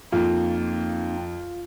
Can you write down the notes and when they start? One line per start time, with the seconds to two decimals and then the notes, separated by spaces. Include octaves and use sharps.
0.12 F2 A#3 C4 D#4 F4